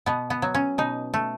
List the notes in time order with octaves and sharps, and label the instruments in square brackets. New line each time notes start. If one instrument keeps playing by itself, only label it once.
[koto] B2 B3
B3
F#3
C#4
B2 D#4
A3